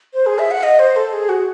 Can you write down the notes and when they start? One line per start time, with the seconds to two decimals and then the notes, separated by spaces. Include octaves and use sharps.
0.14 C5
0.26 G#4
0.39 E5
0.51 F#5
0.63 D#5
0.79 C5
0.96 A4
1.13 G#4
1.29 F#4